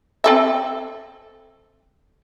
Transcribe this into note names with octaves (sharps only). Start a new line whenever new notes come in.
C4 A4 E5